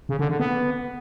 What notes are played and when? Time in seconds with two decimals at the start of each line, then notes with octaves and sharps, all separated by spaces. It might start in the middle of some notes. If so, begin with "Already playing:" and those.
0.09 C#3
0.19 D3
0.29 D3
0.40 B3